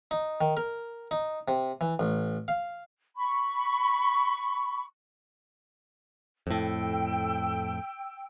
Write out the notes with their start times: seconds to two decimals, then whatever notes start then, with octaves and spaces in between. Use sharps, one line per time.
0.11 D#4
0.41 D#3
0.57 A#4
1.11 D#4
1.48 C3
1.81 E3
1.99 A1
2.48 F5
3.17 B5 C#6
6.47 F2 A2 G5 E6